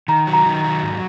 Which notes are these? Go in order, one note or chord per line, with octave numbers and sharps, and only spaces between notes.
D#3 A#5
F#3
A#5
D#3
F#3
G#2